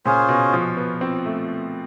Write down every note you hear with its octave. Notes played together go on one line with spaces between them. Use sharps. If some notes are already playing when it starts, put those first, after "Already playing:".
A#2 C#4 F4 G#4 C5
B2
F3
B3
C4
A3